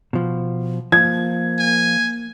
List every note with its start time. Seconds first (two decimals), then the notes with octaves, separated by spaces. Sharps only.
0.13 B2 F3
0.92 F3 A#3 G#6
1.58 G#5